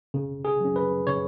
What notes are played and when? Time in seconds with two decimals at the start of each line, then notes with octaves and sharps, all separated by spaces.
0.14 C#3
0.45 G#4
0.60 F#3 C#4
0.76 B4
1.07 C#3 C#5